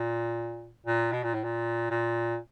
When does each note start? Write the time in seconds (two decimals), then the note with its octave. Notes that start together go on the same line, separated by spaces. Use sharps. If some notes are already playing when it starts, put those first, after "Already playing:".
Already playing: A#2
0.86 A#2
1.12 B2
1.23 A#2
1.34 A2
1.43 A#2
1.90 A#2